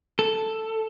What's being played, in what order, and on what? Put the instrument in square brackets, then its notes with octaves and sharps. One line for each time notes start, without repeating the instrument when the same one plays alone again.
[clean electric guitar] A4